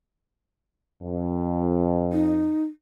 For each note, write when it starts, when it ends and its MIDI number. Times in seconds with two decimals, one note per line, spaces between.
1.02 2.50 41
2.13 2.64 63